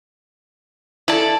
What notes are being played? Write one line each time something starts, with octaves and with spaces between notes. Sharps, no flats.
E4 A4 D5 A5